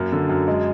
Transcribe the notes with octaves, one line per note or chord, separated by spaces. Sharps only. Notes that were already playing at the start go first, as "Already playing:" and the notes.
Already playing: F#2 A#3
D3
F#2
G#3